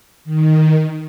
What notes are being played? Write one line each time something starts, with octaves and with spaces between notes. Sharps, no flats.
D#3